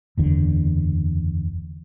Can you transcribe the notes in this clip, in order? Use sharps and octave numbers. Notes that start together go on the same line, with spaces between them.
F#1 E2 D3